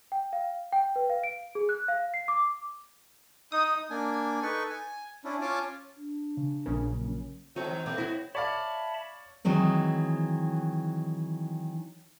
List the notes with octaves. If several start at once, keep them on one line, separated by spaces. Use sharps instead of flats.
G5
F5
G5
B4
F5
D7
G#4
F#6
F5
C7
D6
D#4 D#6
A#3 D4 G#5
D#4 A4 B4 C#6
G#5
C#4 D4 E4
C#4 F4 C#5 G#5 A5 D6
D4
C#3
A#1 A#2 C#3 C#4 A#4
F#3
D#3 F#3 G#3 C4 C#5 D#5
C3 E3 G#3 A3 C4
B3 E4 F#4
C#5 D5 E5 F5 A5 B5
D#3 E3 F#3 G#3 C4